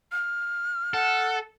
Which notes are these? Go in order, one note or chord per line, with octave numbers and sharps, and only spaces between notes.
F6
A4 F#5